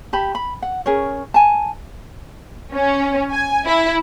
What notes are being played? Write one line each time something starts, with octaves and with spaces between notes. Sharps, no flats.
G4 A5 B5
B5
F#5
C#4 G#4 A#4 C#5
G#5 A5
C#4
G#5
E4